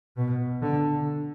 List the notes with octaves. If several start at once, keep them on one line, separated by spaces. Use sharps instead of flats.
B2
D3